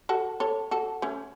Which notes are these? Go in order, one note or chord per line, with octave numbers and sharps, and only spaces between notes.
F#4 A4
A4 C#5
F#4 A4
A3 C#4